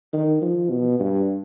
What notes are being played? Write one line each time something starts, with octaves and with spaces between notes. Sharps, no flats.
D#3
F3
B2
G2